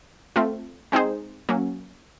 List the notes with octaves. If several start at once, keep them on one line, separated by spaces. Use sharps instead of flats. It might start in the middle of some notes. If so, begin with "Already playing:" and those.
A3 C4 F4
G#3 C4 D#4 G#4 C5
F#3 A#3 C#4